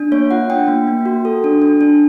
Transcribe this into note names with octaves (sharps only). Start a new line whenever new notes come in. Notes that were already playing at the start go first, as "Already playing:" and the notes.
Already playing: D4
A#3 C#5
F4 F#5
D4 G5
A#3
A#3
F#4
A4
D4
D4
D4